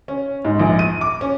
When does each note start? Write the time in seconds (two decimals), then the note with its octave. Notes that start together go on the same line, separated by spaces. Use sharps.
0.08 C#4
0.45 G#2
0.59 A#1
0.79 D#7
1.01 D6
1.21 C#4